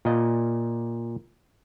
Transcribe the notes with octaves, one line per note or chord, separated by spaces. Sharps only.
A#2 D#5